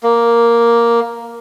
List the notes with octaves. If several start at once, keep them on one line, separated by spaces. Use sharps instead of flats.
A#3